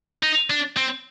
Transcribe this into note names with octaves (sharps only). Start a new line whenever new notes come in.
D#4
D4
C4